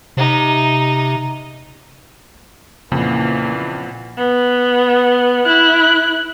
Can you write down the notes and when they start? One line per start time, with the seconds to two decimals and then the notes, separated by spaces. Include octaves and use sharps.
0.17 C3 D#4
2.92 F2 A#2 C#3 E3 A#3 B3
4.17 B3
5.45 E4 F#6